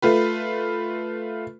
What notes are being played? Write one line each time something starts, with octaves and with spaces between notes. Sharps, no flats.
A3 F4 B4